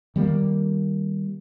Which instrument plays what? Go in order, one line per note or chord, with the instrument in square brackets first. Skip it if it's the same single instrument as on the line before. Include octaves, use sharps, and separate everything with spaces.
[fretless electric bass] D#3 G3 A3 A#3